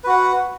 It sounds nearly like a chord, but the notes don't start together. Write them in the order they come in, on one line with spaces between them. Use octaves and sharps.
B4 F#4 F#5